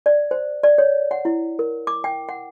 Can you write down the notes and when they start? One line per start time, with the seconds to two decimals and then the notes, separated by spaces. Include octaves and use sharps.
0.06 D5
0.31 C5
0.64 D5
0.78 C#5
1.11 F#5
1.25 E4
1.59 A#4
1.87 D6
2.04 G5
2.29 F#5